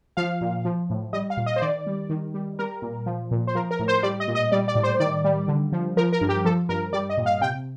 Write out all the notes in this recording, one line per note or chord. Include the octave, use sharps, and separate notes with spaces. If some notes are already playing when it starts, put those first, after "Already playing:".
F3 F5
A#2
F3
A2
G3 D#5
F5
A#2
D#5
C5
D#3 D5
G3
D#3
G3
G3 A#4
A#2
F3
A#2
C5
F3 A#4
A#4
A2
C5
G3 D5
D#5
A#2
D#5
G3 D5
D5
A2
C5
D#3 D5
G3
D3
F3
F3 A#4
A#4
G2
G4
F3 A4
G2 A#4
G3 D5
D#5
A#2
F5
C3 G5